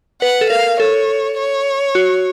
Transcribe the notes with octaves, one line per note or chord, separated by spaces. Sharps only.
B4 F#5
A4
A#4 F5
A4 C#5
C#5
F#4